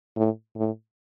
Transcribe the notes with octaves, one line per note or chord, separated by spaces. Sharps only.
A2
A2